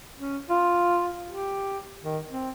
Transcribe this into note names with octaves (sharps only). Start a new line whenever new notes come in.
C#4
F4
G4
D#3
C4